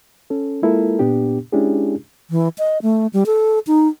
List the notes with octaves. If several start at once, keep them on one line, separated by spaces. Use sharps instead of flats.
C#4 A4
G#3 A#3 E4 F4 A4 A#4
A#2 B3 D4 G4
G#3 C#4 D4 E4 G4 G#4
E3
D#5
A3
G3
A4
D#4